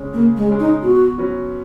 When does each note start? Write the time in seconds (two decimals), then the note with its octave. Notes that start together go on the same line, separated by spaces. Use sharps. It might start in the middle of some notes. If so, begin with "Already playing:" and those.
Already playing: C#3 G#3 C#4
0.13 C#3 A#3
0.37 G#3
0.49 G#3 C#4
0.60 D#4
0.83 B2 F#4
1.18 F#3 C#4 F#4 B4